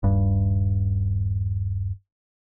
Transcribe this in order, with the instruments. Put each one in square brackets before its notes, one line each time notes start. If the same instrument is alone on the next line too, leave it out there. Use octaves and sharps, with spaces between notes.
[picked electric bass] D#1 G2